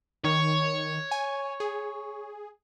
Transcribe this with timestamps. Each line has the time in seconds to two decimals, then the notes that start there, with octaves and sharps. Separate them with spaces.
0.24 D#3 C#5
1.11 G#5
1.60 G#4